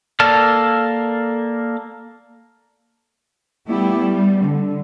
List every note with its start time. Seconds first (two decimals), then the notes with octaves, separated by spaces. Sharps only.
0.20 A#3 A4 D5 A5 F6
3.67 G3 A3 B3 E4 G4
4.02 G3
4.42 D3